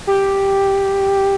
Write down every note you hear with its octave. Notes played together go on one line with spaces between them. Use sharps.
G4